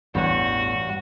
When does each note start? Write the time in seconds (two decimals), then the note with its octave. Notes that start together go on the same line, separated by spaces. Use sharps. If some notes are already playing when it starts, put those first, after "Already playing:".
0.15 A1 E2 G2 F#4 C#5